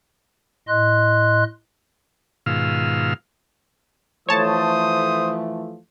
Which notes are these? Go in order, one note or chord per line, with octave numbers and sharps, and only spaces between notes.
A2 D#5 C6 F#6
G#2 B2 D#3 F4 F5 E6
E3 F3 A3 C5 C#5 A5 D#6